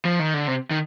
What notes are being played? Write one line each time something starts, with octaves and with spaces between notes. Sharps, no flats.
F3
D#3
D3
C3
D#3